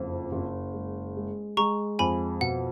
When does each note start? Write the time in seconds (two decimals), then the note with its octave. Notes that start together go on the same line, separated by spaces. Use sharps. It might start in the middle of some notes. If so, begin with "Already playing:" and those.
Already playing: F#1 F2
0.32 F#1
0.73 G#3
1.16 G#3
1.57 G#3 A#5 C#6
1.99 F2 G#5 B5
2.41 B2 F#5